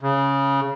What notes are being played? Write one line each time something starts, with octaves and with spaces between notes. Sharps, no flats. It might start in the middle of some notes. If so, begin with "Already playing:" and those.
C#3